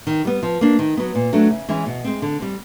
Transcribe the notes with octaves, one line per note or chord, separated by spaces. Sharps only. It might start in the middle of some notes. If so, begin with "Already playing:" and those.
D#3
G3 B3
F3
A#3 D4
D#3
F#3 B3
A#2
F#3 A3 D4
C#3
E3 G#3 C#4 E4
B2
G#3 C4
D3
G3 C4